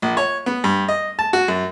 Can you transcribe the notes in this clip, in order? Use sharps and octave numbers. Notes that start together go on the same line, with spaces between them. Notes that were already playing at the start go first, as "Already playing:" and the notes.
A#1
C#5
B3
G2
D#5
A5
F#4
F#2